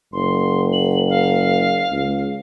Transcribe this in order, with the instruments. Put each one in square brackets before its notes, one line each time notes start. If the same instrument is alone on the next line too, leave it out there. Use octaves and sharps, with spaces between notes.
[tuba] F#1 [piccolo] C6
[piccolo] F#7
F5
[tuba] C#2